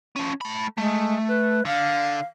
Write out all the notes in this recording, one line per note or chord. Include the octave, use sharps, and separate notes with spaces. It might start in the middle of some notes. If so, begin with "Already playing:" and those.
F3 C#4
A3 B5
G#3 A3
B4
D3 F5